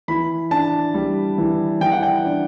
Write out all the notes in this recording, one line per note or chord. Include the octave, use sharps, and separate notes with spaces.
E3 B5
D4 A5
G3
E3
E3 G5
F#5
G5
D4